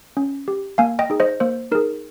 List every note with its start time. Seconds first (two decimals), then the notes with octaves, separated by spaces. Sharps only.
0.17 C#4
0.48 G4
0.78 A#3 F5 G#5
0.99 D#5 G5
1.10 D#4 G#4
1.20 C5 D#5
1.40 A#3 C5
1.72 D#4 G#4 A#4